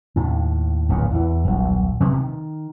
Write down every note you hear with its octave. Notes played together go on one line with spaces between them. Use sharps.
D#2 A2
D1 A#1 A#2 B3
E2 E3
D#1 B1
C3 F#3 B3
D#3